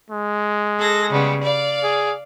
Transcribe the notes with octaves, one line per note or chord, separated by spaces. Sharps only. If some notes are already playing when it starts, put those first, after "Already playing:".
G#3
G#4 A4 A#6
C#3 G3 B3
D5 F5
G#4